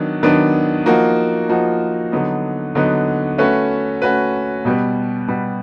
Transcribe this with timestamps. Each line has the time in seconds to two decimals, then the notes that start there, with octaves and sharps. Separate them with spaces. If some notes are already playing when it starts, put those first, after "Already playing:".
Already playing: D#3 F#3 B3 D4
0.23 D#3 F#3 B3 D4
0.86 F3 A#3 D#4 F#4
1.49 F3 A#3 D#4 F#4
2.12 D3 F#3 B3 D#4
2.75 D3 F#3 B3 D#4
3.38 A3 C#4 F#4 B4
4.02 A3 C#4 F#4 B4
4.65 B2 G3 B3
5.28 B2 G3 B3